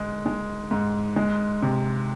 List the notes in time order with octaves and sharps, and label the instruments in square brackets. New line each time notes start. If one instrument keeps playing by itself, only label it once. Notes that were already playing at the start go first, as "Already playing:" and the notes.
Already playing: [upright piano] G#2 G#3
G#3
G#2
G#3
C3